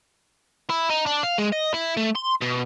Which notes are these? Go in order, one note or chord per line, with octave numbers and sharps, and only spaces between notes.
E4
D#4
D4
F5
G#3
D#5
E4
A3
C6
B2